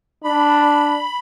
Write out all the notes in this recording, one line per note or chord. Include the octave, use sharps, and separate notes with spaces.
D4 B5